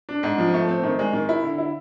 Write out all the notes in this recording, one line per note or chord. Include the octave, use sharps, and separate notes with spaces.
D4
G#2
F3
A3
C4
D#3
G#3
D#3
E4
D3
E4